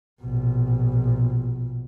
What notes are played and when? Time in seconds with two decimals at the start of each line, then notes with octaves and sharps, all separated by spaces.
0.21 A#1 B2